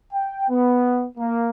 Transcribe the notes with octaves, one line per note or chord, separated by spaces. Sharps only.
G5
B3
A#3